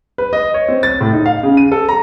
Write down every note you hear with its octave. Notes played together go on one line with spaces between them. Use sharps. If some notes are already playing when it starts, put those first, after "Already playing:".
B4
D#5
C#5
C4
A6
A2
D#4
F5
C#3
D#7
A4
A#5